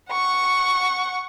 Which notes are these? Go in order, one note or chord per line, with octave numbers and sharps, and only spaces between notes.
F#5 C#6